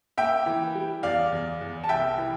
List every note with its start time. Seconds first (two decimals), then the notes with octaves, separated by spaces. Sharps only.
0.18 A#3 E5 G5
0.46 E3
0.75 G3
1.03 E2 D5 F5
1.32 E2
1.61 E2
1.84 A5
1.89 C2 E5 G5
2.18 E3